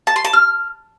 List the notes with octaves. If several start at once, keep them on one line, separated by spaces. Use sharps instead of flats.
A5
C6
A5
F6